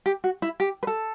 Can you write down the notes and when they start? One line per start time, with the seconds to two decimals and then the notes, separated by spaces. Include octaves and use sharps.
0.06 G4
0.24 F#4
0.42 E4
0.60 G4
0.83 B4
0.87 A4